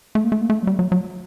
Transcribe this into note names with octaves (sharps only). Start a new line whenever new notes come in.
A3
A#3
A3
A#3
A3
F#3
G3
F#3
F#3